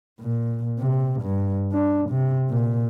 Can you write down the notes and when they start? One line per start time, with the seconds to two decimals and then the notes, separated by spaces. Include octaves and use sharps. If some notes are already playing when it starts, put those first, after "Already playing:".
0.21 A#2
0.79 C3
1.22 G2
1.72 D4
2.10 C3
2.50 A#2